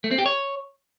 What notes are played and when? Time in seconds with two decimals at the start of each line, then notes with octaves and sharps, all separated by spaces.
0.04 A3
0.11 C4
0.18 G4
0.26 C#5